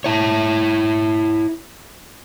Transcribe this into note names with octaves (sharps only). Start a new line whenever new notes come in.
E4 C#5